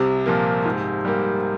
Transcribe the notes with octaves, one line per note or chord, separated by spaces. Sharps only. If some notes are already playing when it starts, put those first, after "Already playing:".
Already playing: C2 C3
A#2 F3 A#3
G#2
G3 A#3